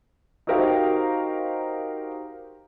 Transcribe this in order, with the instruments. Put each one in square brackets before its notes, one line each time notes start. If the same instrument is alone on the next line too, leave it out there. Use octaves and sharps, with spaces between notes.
[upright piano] D#4 F#4 G4 A#4 C5 F5